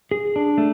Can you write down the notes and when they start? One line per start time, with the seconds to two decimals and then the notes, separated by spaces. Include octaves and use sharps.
0.11 G#4
0.36 D4
0.58 A3